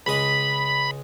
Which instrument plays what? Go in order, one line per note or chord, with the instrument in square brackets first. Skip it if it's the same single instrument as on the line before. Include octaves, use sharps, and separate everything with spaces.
[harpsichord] C#2 G#3 D#5 [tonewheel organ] B5